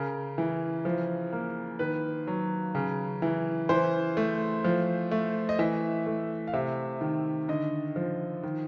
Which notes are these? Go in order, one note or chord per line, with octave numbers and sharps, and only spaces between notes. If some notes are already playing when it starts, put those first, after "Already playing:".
Already playing: C#3 A#4
E3
F3
A#3
D#3 B4
F#3
C#3
E3
E3 C5
A3
F3
A3
D#5
E3 E5
A3
F5
C3 E5
D#3
D3 D#5
F3
D#3